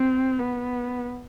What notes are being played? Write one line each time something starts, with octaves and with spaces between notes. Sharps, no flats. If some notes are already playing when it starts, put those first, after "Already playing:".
Already playing: C4
B3